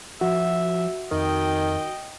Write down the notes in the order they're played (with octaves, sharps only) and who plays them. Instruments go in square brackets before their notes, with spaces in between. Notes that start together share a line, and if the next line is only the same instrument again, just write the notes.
[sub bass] F3 [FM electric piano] F#4 [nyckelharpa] E5
[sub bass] F2 [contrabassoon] D#3 [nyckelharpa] D#5 G5